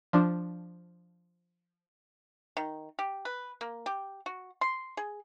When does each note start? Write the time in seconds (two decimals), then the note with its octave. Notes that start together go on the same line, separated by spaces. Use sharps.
0.13 F3 D4
2.57 D#3
2.99 G4
3.25 B4
3.61 A#3
3.86 G4
4.26 F#4
4.61 C6
4.97 G#4